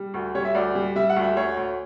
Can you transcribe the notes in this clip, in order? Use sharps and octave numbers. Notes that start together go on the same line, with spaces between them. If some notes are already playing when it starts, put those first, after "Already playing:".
Already playing: G3
D2
G3 C#5
E5
D2 D5
G3
G3 E5
F#5
D2
E5
D2 C#5
D2